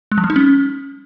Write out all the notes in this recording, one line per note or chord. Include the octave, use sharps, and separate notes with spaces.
G#3
F3
G3
D#4
C#4